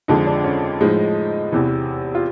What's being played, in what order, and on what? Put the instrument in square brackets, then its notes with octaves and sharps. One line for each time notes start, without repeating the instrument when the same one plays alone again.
[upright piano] F2 D3 F3 G#3 D#4
D4
C#4
A2 F3 G#3 D#4
E2 C3 E3
F4